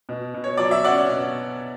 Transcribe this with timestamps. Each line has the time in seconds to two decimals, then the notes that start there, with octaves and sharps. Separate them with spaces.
0.09 B2
0.34 B2
0.44 C#5
0.57 F#3 D5
0.71 E5
0.84 C#4 D5 F#5
1.10 B2